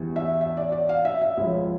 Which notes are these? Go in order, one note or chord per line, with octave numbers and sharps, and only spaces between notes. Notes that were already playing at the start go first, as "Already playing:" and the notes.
Already playing: E2 E3 G3
E5
E5
D5
D5
F5
E5
E5
C#2 C#3 F3